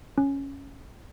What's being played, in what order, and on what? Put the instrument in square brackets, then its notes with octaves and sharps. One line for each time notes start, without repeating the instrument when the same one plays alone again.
[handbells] C#4